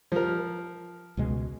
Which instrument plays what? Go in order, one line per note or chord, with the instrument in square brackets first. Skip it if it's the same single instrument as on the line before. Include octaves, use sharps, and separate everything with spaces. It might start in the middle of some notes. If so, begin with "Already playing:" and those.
[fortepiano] F3 A#4
[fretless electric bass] C#2 B2 G#3